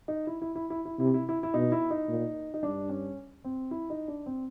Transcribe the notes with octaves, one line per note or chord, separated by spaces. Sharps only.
D#4
E4
E4
E4
E4
E4
C3 E4
E4
E4
E4
B2 D#4
E4
D#4
A#2
D#4
G2 D4
C#4
C4
E4
D#4
D4
C4